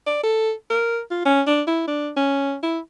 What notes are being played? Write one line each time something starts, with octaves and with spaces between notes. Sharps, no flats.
D5
A4
A#4
F4
C#4
D4
E4
D4
C#4
E4